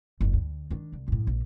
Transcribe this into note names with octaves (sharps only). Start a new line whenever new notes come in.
F#1 G2
D2
D#3 D4
C2
F#2 A2
A#1